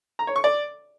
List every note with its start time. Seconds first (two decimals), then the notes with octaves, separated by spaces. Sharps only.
0.19 A#5
0.27 C#5
0.36 C#6
0.44 D5